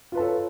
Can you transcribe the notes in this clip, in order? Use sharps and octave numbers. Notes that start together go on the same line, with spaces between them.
F4 A4 B4 C#5 A5